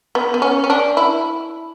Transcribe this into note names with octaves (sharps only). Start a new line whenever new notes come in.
B3
B3
C#4
C#4
D4
E4